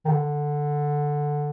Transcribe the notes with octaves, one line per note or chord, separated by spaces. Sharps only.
D#3
D3